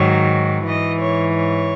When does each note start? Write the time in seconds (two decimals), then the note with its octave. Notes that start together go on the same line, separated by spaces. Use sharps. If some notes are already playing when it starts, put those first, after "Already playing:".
Already playing: G#2 D#3 F#3 C#5
0.66 G#2 E3 D#5
1.00 C#5
1.32 C#5